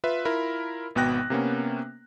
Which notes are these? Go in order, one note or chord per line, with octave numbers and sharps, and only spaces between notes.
F4 B4 E5
E4 F4 A#4 B5
G#1 B2 B3 G5 F#6 A#6
C3 A#3 B3 C#4